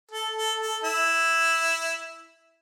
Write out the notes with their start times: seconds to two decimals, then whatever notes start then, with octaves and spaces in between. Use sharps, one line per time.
0.11 A4
0.36 A4
0.60 A4
0.84 E4